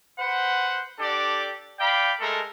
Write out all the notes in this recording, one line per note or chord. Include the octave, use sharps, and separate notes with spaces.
B4 C5 F#5
D4 G4 A4 D5
D5 F5 G5 B5
G#3 A3 A4 A#4